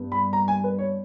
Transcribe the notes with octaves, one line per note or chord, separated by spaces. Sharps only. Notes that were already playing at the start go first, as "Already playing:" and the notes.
Already playing: G2 G3 B3
B5
A#5
G#5
B4
C#5